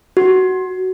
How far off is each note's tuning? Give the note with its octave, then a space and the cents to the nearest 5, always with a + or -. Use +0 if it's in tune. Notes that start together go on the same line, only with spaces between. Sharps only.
F#4 +15